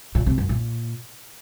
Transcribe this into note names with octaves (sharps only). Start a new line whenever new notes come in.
A#2
C3
F#2
A#2